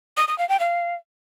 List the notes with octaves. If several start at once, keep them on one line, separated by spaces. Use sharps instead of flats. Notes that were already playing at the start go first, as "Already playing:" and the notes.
D#6
D#6
F5
G5
F5